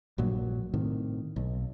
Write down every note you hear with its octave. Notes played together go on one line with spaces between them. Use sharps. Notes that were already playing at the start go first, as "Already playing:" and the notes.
A#1 G2 A#2 F#3
A2 C3 D#3
B1